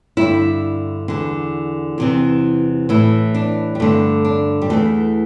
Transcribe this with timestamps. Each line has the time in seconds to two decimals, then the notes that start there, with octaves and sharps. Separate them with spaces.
0.17 G2 D3 E4
1.08 E2 D3
1.98 E2 C3 E3
2.89 A2 E3 E4
3.35 D4
3.75 G3
3.80 G2 D3 A3
4.25 D4
4.62 G3
4.70 E2 E3 A3